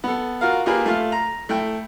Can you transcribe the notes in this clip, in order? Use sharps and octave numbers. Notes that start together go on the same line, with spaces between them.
B3 A4
F4 F#4 A#4 F5
A#3 F4 G4 G#4 A#4 B4
A3 F4 F5
A#5
A3 E4 G5